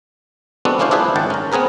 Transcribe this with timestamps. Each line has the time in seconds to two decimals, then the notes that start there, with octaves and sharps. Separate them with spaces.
0.65 G#3 B3 C4 D4 F#4 A4
0.79 A#3 C#4 D4 E4 C5 F5
0.91 D4 E4 F4 G#4 B4 C5
1.16 G#1 D#3 C#4 F#5 G5 A5
1.30 C#4 A#4
1.52 B3 C4 G#4 A#4 B4